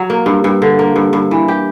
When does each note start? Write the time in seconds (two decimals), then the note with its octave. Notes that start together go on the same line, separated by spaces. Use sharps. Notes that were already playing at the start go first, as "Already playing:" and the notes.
Already playing: F#3
0.10 A#3
0.26 G2
0.44 G2
0.62 D3
0.79 A#3
0.96 G2
1.13 G2
1.31 E3
1.48 G4